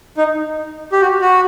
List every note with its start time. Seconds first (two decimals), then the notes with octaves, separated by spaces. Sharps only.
0.17 D#4
0.92 G4
1.01 F#4
1.21 F#4